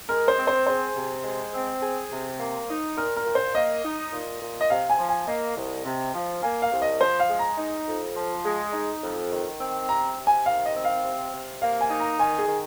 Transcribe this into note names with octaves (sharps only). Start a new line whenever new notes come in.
G#3 A#4
C5
C4
C5
G#4 C5
C3
G#3
C4
G#4
C3
A#3
D#4
A#2 A#4
A#4
A#2
C5
A#3 D#5
D#4
A#2
A#2
D#5
C3 F5
G#5
F3
G#5
A#3 D#5
C2
C3
F3
A#3 G#5
F5
C2
D#5
F3 C5
F5
G#3
A#5
D#4
F2
F3
G#3
D#4
F2
D#3
C4
C3 A#5
C3
G#5
D#3 F5
D#5
C4
F5
C3
C3
A#3 F5
G#5
D#4
A#5
D#3 G#5
G#4
D#3